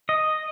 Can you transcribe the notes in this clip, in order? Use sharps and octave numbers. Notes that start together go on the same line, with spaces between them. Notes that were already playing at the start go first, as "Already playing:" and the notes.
D#5